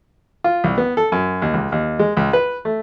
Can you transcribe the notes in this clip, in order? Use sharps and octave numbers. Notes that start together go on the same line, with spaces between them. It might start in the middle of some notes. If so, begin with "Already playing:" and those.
F4
C2
B3
A4
F#2
D#2
C#2
D#2
G#3
C#2
B4
A3